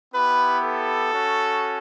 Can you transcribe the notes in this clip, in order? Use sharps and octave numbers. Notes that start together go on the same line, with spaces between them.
B3 E4 G4 B4
A4
C#4 F#4